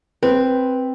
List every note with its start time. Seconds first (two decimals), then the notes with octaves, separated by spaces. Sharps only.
0.23 C4 B4